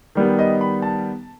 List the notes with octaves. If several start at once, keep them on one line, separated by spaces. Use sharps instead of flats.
D#3 G3 B3
D#5
B5
A5